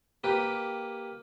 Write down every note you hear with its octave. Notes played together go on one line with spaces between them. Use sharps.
A#3 G4 B4